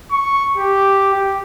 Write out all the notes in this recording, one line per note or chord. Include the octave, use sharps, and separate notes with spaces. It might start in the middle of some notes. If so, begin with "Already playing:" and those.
C#6
G4
G4